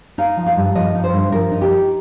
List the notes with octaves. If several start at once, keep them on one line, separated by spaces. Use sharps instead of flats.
D#4 F5
F3
F5
G2
F3 D#5
D#4
C5
G2
F3 A#4
D#4
G4
D#4